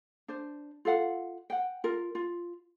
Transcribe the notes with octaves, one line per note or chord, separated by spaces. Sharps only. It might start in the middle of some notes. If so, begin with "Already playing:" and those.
D4 C5
F4 A4 F5 F#5
F#5 G5
F4 A#4
F4